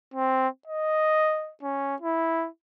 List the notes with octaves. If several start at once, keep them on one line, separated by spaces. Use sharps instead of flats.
C4
D#5
C#4
E4